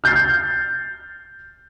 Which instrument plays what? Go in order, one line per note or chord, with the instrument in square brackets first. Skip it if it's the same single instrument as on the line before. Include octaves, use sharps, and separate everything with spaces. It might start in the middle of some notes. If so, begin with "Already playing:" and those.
[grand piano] F6 G6 A6 C7